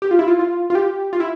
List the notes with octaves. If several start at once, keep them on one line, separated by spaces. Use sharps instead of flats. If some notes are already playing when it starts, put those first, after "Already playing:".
G4
F4
E4
F4
F4
F4
G4
F4
E4